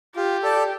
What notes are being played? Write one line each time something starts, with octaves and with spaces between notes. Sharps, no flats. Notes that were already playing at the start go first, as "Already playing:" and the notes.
F4 G4
A4 D5 A5